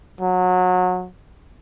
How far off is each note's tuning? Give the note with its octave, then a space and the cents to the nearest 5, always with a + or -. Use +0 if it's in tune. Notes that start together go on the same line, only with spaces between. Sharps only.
F#3 -25